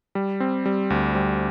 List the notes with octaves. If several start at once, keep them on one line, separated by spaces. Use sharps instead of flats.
G3
C4
G3
D2
G3